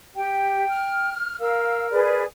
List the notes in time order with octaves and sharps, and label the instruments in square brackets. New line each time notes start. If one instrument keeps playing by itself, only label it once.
[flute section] G4 [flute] G5
[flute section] F6
[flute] A#4 [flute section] F5 E6
[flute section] G#4 B4 D5